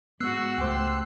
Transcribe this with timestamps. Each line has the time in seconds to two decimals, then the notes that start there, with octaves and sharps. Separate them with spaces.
0.20 G#2 B3 F#4 E6 F#6 C7
0.58 C#2 A3 G4 C5